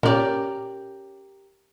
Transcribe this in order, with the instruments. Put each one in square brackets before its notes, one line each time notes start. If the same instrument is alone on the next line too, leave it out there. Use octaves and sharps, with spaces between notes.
[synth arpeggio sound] A#2 F6 [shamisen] C#4 D5 [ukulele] G4 A#4